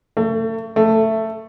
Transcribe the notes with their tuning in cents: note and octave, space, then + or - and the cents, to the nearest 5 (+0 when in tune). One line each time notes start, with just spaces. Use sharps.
A3 +35
A3 +10